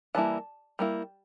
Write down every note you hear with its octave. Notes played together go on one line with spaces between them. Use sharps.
E3 G3 A#3 E4 A5
G3 A#3 E4